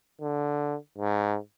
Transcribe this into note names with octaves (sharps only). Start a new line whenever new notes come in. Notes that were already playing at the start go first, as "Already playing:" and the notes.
D3
G#2